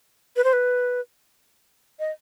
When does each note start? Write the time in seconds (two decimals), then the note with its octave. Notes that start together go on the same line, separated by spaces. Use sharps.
0.36 B4
0.44 C5
0.53 B4
1.99 D#5